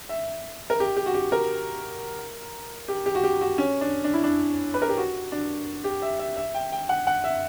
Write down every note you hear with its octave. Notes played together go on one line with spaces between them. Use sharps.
E5
A#4
G4
G4
F#4
G4
A#4
G4
G4
F#4
G4
F#4
C#4
D4
D4
E4
D4
B4
A#4
G4
F#4
D4
G4
E5
E5
E5
G5
G5
F#5
F#5
E5